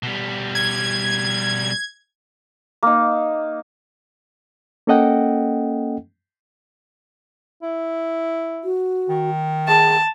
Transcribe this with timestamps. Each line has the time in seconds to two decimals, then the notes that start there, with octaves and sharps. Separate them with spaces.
0.03 B2 G3
0.55 G#6
2.83 A#3 D#4
4.87 A#3 C#4 A4 D#5 F#5 G5
7.63 E4
8.64 F#4
9.09 D#3
9.68 G#4 A5